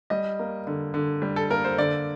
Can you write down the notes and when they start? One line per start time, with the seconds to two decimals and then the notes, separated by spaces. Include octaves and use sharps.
0.10 G3 D#5
0.39 A#3
0.67 D3
0.94 D3
1.22 G3
1.36 A4
1.50 A#3 A#4
1.65 C5
1.78 D3 D5